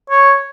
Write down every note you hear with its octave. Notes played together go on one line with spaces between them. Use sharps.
C#5